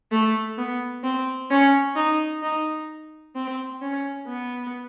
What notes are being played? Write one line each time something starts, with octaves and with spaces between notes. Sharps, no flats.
A3
B3
C4
C#4
D#4
D#4
C4
C#4
B3